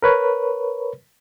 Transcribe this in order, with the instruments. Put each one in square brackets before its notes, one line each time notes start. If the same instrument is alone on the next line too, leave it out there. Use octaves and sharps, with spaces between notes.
[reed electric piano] A#4 B4 C#5